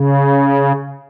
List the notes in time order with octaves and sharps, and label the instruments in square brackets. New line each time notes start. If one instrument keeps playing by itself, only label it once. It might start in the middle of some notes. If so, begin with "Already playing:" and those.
Already playing: [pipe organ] C#3